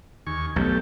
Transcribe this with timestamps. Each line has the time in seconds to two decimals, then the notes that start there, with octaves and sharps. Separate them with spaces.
0.27 D#2 G#5 C#6
0.56 B1 A3 G4